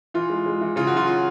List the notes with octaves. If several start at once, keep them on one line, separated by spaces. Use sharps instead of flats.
E3 F4
G#3
G#3
E3
C#3 F4
F#3 F#4
F4
F4